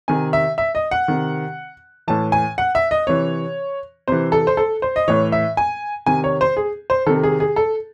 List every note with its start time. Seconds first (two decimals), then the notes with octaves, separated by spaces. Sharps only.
0.08 C3 D#3 G#5
0.33 E5
0.58 E5
0.75 D#5
0.91 F#5
1.08 C3 D#3
2.08 A2 E3 A5
2.32 G#5
2.58 F#5
2.75 E5
2.91 D#5
3.07 C3 E3 C#5
4.08 C3 E3 C5
4.32 A4
4.47 C5
4.57 A4
4.82 C5
4.96 D#5
5.08 A2 E3 C#5
5.32 E5
5.57 G#5
6.06 C3 D#3 G#5
6.24 C#5
6.41 C5
6.57 G#4
6.90 C5
7.07 C3 D#3 A4
7.23 G#4
7.40 G#4
7.56 A4